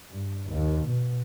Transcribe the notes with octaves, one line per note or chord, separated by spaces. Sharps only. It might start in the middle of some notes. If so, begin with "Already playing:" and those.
G2
D#2
B2